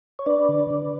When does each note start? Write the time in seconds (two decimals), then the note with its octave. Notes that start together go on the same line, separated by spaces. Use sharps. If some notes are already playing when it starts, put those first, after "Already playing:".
0.19 C#5
0.26 D4 B4 D5
0.49 D3
0.71 D3